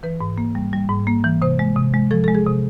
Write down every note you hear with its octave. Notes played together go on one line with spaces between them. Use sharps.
E3 B4
G#2
A#3
G3
G3
G#2
A#3
E3
C3 C5
G#3
C3
G#3
F3 A4
G#3 A4
G#4
C3